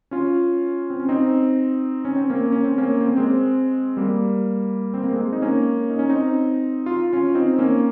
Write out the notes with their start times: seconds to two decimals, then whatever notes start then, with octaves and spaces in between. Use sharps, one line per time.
0.11 C#4 F4
0.90 C4
1.00 C#4
1.09 C4 D#4
2.05 C#4
2.17 C4
2.30 A#3 C#4
2.52 C#4
2.65 C4
2.78 A#3 C#4
3.00 C4
3.09 A#3
3.17 G#3 C4
3.97 G3 A#3
4.94 C4
5.03 A#3
5.13 G#3 C4
5.32 D#4
5.42 A#3 C#4
5.90 D#4
5.99 C#4
6.09 C4 D#4
6.86 F4
7.13 C#4 F4
7.35 C4 D#4
7.59 A#3 C#4